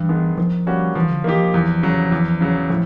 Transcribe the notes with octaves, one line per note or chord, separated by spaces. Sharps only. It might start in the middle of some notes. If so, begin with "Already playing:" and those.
Already playing: G2 E3
D#3 G#3 B3
D#3 F3
G3 A#3 C#4 F#4
E3 F3
D3
E3 A#3 D#4 G4
F3
E2
C#3 F#3
E2
C#3 F#3
A2 F3